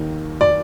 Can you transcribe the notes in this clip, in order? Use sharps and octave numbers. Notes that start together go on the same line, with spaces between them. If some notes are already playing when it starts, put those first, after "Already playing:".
Already playing: D#2 D#3
D5